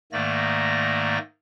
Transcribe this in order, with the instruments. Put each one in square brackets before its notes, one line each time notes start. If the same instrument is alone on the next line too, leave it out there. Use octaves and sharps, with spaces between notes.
[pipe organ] G#2 D#3 A3 A#3 D5 A#6